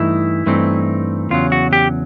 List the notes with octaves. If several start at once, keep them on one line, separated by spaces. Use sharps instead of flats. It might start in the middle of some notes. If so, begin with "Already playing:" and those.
Already playing: G2 E3 A3 D#4 E4
G2 E3 A3 C4 D#4
E2 C#3 F#3 F4
F#4
G4